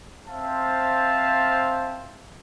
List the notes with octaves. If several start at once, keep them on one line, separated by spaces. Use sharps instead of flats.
C4 C5 E5 F5 A5